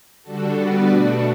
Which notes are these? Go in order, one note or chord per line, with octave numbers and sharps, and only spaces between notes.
D3 G3 D4 F#4 A4
G3 B3 F#4 B4 D5
B2 A3 D4 F#4